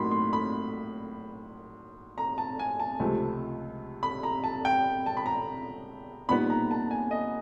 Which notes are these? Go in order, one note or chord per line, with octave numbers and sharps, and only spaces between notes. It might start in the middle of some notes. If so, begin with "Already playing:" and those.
Already playing: A2 F#3 A#3 D#4 B5 C6
C6
B5
A#5
A5
G#5
A5
C#2 C3 F3 A3
B5
A#5
A5
G5
A5
B5
A#5
A#2 G3 B3 D#4 B5
A#5
A5
G#5
D#5